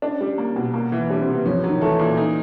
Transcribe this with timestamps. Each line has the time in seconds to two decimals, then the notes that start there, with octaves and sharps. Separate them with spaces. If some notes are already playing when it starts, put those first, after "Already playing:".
0.02 C#4 D4
0.21 G3
0.38 A#3
0.56 B2
0.74 A#3
0.92 E3
1.09 G3 D4
1.21 C4
1.28 C3
1.34 B3
1.46 F3 C#4
1.64 F#3
1.69 D#3
1.81 E3 A3
1.99 A#2
2.17 D#4